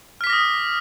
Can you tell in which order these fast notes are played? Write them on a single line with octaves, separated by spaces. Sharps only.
F6 B6 D6 A#6 D#6